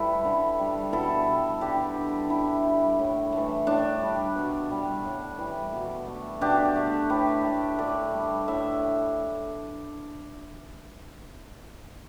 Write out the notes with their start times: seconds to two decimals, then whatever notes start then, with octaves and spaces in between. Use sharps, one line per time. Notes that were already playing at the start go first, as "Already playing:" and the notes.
Already playing: G3 A3 E4 A4 B4
0.25 D3
0.59 G3
0.93 B2 E4 A4
1.27 G3
1.61 D3 D4 G4
1.96 G3
2.30 D3 E4
2.64 G3
2.99 A2
3.32 E3 A3
3.67 A2 D4
4.01 G3
4.35 B2
4.71 G3
5.05 A2
5.38 E3 G3
5.73 B2
6.07 A3
6.41 B2 D4 G4
6.76 A3
7.10 A2 G4 B4
7.45 A3
7.78 D3 A4 D5
8.13 G3
8.48 A2 E5